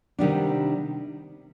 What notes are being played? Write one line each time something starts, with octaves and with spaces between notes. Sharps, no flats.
C3 D#3 G3 B3 D4